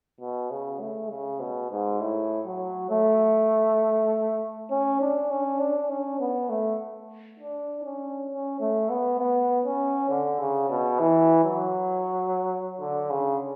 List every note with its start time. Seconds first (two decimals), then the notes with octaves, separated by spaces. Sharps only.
0.20 B2
0.50 C#3
0.80 A3
1.10 C#3
1.40 B2
1.70 G#2
2.00 A2
2.46 F#3
2.90 A3
4.71 C#4
5.01 D4
5.31 C#4
5.59 D4
5.89 C#4
6.20 B3
6.49 A3
7.40 D4
7.84 C#4
8.30 C#4
8.60 A3
8.90 B3
9.19 B3
9.65 C#4
10.09 D3
10.40 C#3
10.70 B2
10.99 E3
11.44 F#3
12.80 D3
13.10 C#3